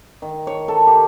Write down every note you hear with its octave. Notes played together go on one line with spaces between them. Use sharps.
D#3
C#5
A4
G4